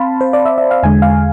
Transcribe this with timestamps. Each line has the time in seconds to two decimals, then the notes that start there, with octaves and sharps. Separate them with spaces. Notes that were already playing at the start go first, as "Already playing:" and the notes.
Already playing: C4 F5 A5 B5 C6
0.21 C5
0.33 D5
0.46 E5
0.58 E5
0.71 F5
0.83 E2 D3 G#3 G#5
1.02 F5